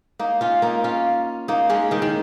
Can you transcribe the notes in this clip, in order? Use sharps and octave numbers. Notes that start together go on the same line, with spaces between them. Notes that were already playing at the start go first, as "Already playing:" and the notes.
A#3 D#4
C#4 F4
A#3 D#4
C#4 F4
A#3 D#4
G#3 C#4
D#3 G#3
D#3